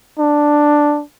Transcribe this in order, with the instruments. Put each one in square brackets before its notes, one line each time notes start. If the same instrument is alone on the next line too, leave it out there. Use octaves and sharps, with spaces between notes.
[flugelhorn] D4